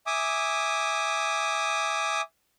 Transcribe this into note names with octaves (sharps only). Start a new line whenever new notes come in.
E5 G#5 D6 D#6